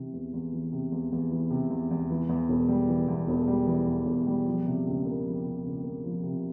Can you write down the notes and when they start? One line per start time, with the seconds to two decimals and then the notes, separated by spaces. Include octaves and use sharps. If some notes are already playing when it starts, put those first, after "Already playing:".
Already playing: C3 E3
0.13 E2
0.33 E2
0.53 E3
0.72 C3
0.92 E2
1.12 E2
1.31 E3
1.50 C3
1.70 E2
1.91 E2
2.10 E3
2.29 E2
2.49 E1
2.69 G3
2.88 E3
3.08 E2
3.28 E1
3.48 G3
3.67 E3
3.86 E2
4.06 E1
4.27 G3
4.46 F3
4.65 C3
4.86 C#2
5.06 A#3
5.24 F3
5.45 C3
5.64 C#2
5.83 A#3
6.04 F3
6.23 C3